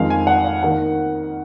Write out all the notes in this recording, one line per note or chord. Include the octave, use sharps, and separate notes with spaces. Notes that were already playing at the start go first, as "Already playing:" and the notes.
Already playing: F2 D#3 G#3 F5
G#5
F#5
F5
D#3 A#3 F#5